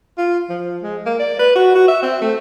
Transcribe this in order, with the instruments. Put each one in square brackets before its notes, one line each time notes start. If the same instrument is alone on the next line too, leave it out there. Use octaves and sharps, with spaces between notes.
[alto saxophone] F4
F3
G#3
A#3
D5
B4
F#4
F#4
E5
C4
A3